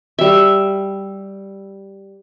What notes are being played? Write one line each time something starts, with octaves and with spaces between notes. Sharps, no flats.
G3 E5